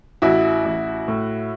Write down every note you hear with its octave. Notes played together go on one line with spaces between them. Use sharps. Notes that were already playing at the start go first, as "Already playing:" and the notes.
A1 E4 F#4
A1
A2